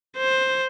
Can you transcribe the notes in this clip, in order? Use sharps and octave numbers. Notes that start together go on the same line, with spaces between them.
C5